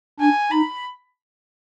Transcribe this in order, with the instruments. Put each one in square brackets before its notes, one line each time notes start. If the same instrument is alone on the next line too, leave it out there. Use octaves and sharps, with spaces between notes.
[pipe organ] D4 [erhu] G#5
[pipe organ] D#4 [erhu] B5